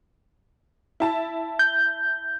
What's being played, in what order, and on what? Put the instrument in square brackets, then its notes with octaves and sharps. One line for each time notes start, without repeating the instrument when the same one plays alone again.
[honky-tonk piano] E4 A5
[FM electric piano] G6